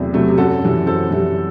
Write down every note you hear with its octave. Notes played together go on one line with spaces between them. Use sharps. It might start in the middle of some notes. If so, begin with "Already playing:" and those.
Already playing: E2 C3 F#3 A3
C3 F#3 A3
G4
F#2 F#4 A4
E3 G3
F#2 A4 C5
E3 G3